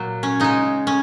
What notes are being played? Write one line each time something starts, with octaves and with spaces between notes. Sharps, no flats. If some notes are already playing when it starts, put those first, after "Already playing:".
Already playing: A#2 F#3
C#4
C#3 G#3 D#4
C#4